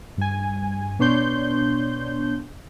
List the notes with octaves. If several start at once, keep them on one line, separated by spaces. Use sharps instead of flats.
G2 G#5
B2 B3 D4 C#5 C6 G6